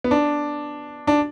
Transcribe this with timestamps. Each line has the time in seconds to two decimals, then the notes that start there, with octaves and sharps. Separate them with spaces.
0.04 B3
0.11 D4
1.07 D4